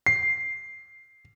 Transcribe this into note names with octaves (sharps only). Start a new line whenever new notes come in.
C7